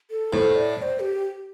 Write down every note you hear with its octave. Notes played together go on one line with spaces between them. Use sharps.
A4
A2 C5
D5
D5
C5
G4